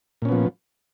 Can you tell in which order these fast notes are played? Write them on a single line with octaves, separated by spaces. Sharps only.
A#2 C#4 B3 F3